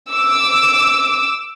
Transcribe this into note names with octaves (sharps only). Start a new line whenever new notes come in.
D6 E6